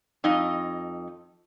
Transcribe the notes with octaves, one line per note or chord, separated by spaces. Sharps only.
F2 D#4 D#5